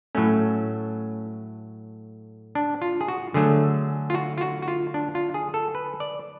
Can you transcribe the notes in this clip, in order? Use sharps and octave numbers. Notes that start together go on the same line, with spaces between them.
A2 F#3 A3 C#4
D4
F4
G#4
F#4
D3 F#3 A3 G#4
F4
F#4
F4
F#4
F#4
F4
D4
F4
G#4
A4
B4
D5